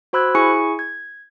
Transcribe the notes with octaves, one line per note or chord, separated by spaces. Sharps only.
F#4 C5 B5 E6 F#6 G#6
E4 G#4 G#5 C#6 C#7
G#6